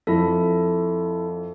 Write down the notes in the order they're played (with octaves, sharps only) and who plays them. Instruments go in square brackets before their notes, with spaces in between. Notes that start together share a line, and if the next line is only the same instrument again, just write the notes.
[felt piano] F2 [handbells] E4 A4